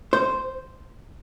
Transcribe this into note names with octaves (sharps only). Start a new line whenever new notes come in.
C5